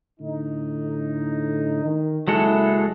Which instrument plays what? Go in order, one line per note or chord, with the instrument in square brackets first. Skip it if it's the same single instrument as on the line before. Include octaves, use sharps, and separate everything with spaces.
[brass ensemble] A2 D3 D#4
D#3
[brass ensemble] F#1 E4 [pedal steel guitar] F#3 G#3 A4